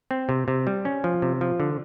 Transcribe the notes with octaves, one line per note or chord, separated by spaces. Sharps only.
C4
C3
C3
G3
C#4
F3
C3
F3
D3